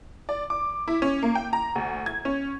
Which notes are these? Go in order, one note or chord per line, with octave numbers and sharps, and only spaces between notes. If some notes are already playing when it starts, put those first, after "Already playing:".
D5
D6
E4
C#4
A#3
G5
A#5
D2
G#6
C#4